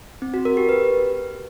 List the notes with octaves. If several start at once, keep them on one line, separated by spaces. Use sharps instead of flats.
C4
F#4
A#4
G4
B4